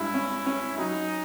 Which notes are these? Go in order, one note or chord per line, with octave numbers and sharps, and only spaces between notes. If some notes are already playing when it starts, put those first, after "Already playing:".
Already playing: G2 G#3 E4
C#4
C#4
F#3 D#4